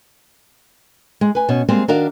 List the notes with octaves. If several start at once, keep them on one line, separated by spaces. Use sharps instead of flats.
G#3
B4 G#5
B2 C#4
G3 G#3 A#3 C4
D#3 D4 F#4 A#4 D5 F5